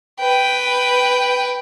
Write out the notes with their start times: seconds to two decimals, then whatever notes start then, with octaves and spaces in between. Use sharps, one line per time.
0.19 B4 G5